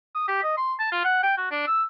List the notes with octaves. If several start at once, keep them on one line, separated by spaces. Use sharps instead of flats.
D#6
G4
D#5
C6
A5
F4
F#5
G5
F#4
D4
E6